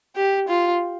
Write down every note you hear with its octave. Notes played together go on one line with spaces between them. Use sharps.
G4
F4